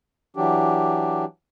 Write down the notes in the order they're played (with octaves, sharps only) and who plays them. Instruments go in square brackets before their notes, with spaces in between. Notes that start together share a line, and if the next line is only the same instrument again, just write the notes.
[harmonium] E3 F#3 D4 G4